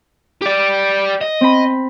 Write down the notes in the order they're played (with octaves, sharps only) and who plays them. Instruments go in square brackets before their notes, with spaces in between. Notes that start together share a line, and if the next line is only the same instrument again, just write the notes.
[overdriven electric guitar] G4 D5
D#5
[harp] C4 B5